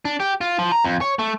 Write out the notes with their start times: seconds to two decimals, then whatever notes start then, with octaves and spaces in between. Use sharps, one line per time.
0.05 D4
0.20 G4
0.41 F4
0.59 F3
0.72 A#5
0.85 F2
1.01 C#5
1.19 A3